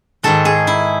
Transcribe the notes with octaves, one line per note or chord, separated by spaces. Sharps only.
G#2 D#3 G#3 A4
G#4
E4